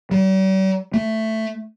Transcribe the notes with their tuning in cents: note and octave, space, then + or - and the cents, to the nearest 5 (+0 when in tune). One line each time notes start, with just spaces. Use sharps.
G3 -45
A3 +5